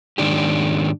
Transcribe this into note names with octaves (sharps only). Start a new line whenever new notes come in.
G#2 D#3 D4 G4